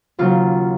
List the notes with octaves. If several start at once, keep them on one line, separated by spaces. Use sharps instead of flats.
D#2 C#3 F#3 F4